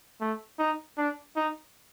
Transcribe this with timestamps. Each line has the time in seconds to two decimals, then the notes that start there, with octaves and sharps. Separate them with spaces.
0.21 A3
0.59 D#4
0.98 D4
1.36 D#4